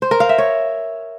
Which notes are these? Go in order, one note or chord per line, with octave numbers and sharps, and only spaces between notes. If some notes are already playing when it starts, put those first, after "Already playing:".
C5
A#4
F5
E5
C#5